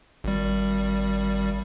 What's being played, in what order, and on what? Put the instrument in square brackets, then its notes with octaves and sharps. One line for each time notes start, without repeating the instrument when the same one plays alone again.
[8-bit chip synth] G#1 G3